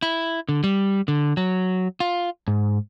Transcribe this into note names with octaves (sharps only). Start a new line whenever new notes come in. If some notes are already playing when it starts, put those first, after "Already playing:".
E4
D3
G3
D3
F#3
F4
G#2